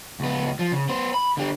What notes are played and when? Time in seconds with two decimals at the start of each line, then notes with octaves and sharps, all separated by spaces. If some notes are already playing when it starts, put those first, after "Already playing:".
0.20 C#2 B3
0.59 F3
0.72 C#3
0.89 B3 C5
1.14 B5
1.37 D3 G4